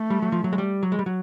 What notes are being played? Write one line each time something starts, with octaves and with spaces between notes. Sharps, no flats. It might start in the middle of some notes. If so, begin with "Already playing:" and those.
Already playing: A3
G3
F#3
F3
F#3
G#3
G3
F#3
G#3
G3
F#3